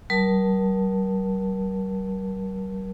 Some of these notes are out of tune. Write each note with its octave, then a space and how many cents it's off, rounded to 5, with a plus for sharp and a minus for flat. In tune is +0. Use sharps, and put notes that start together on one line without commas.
G3 -45 A#4 +30 A5 +0